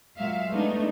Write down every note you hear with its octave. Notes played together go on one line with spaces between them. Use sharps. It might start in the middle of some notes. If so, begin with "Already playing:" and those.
A#2 F#3 G#3 E5 F5
G#3 A3 B3 D4 D#4